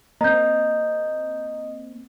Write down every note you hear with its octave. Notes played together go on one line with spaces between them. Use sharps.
A#3 C4 D#5 A#5 G6